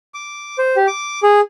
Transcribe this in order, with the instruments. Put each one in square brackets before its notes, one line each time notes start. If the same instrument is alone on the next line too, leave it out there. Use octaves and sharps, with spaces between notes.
[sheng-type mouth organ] D6
C5
G4
D6
G#4